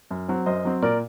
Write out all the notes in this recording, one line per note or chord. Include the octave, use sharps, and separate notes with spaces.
F#2
F#3 C4
F#2 C5 D#5
F#3 C4
A#2 A#4 D5